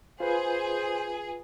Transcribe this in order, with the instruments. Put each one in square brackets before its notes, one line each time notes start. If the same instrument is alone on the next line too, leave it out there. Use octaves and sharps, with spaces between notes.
[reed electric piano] F4 B4 [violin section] G#4 [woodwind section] C5